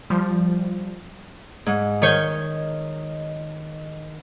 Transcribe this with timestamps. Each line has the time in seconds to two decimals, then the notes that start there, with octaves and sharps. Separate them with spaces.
0.10 F3 G3
1.66 G#2
2.02 D#3 C#5 G6